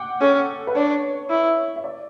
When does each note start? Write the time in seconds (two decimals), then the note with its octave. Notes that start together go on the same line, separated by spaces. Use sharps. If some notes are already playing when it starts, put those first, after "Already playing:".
Already playing: F#5 G5 D6
0.21 C#4 A4
0.67 B4
0.75 D4 C#5
1.30 E4
1.76 E5
1.84 D5